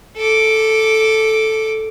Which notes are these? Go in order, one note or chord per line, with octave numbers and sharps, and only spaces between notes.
A4 D6